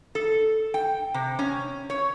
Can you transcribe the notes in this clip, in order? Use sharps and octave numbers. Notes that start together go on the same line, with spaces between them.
A4
G5
C3
C#4
C#5